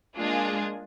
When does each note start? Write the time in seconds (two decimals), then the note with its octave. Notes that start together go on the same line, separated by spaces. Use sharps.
0.17 G#3 A#3 D4 F4 G#4